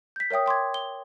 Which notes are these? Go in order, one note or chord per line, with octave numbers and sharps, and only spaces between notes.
G6 B6
A#4 C#5 E5 G5 D#6
G5 C6 D6 G#6
G7